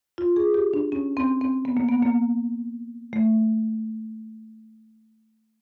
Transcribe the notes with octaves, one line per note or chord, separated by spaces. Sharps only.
F4
G#4
G4
D4
C#4
C4
C4
B3
A#3
B3
A#3
A3